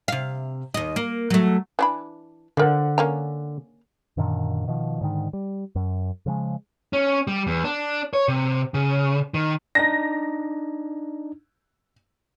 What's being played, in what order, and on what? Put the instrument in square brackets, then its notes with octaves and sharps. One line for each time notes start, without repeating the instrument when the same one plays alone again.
[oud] C3 F5
D#2 D#5
A#3
F#3 A3
[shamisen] E3 D4 B5
[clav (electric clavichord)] D3 F#5 [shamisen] F3 A#4
[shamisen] A#3 C#4 A#5
[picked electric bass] F#2 A#2 D3 D#3
B2 D#3 F3
G#2 D3 D#3
G3
F#2
C#3 F3 G3 G#3
[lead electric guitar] C#4
G3
E2
D4
C#5
C3
C#3
D#3
[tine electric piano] D4 D#4 [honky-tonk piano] A#6